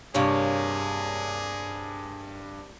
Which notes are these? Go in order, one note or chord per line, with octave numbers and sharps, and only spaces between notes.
G2 C3 A#3 G#4 C#5